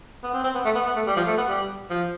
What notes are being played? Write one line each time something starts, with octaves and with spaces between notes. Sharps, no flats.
B3
C4
C4
B3
A3
B3
B3
A3
G3
F3
A3
B3
G3
F3